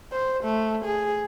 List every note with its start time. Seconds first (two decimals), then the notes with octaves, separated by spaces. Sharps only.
0.12 C5
0.44 A3
0.85 G#4